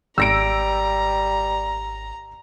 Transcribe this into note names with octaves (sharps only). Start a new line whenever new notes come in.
G#1 G3 A#5 E6 A#6 D7